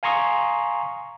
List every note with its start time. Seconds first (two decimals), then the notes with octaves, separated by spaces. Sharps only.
0.03 F5 G#5 A#5 C6 C#6 D#6